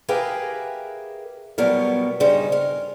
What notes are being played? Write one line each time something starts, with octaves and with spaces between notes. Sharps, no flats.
G4 G#4 A#4 B4 E5 F5
B2 F#3 G3 B3 A#4
G2 C#3 G3 D#4 C5
A#4